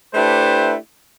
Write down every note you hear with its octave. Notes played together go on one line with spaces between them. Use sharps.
A3 D4 E4 G4 B4 C5